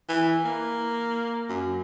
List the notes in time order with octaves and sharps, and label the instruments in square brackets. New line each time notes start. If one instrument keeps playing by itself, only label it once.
[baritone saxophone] E3
A#3
F#2